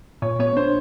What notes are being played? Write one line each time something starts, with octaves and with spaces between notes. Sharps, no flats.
A#2 C#5
B3 C#5
D4 C5